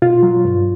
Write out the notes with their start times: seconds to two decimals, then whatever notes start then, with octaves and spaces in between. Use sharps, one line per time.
0.02 B2 F4
0.23 F#3
0.45 G2